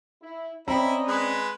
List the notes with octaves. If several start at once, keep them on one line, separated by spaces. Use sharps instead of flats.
E4
C4 C#4 E4 D5 D#5 A#5 B5
G#3 B4